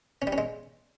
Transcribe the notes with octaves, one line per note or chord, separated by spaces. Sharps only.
C#4
G3
C#4
G#3